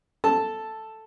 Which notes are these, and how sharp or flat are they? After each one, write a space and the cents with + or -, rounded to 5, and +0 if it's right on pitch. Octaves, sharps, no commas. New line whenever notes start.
A4 +0 A5 +0